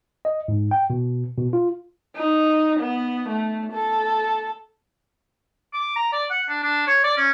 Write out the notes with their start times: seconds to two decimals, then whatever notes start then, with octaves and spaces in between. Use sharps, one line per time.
0.25 D#5
0.48 G#2
0.71 G5
0.90 B2
1.38 B2
1.53 F4
2.16 D#4
2.80 B3
3.29 A3
3.72 A4
5.74 D6
5.96 A#5
6.12 D5
6.30 F#5
6.49 D4
6.63 D4
6.87 C#5
7.04 D5
7.17 C#4